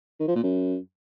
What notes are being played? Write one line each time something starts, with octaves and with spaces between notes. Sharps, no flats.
D#3
F3
A#2
F#2